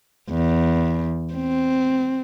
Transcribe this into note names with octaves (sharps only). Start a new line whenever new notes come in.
E2
C4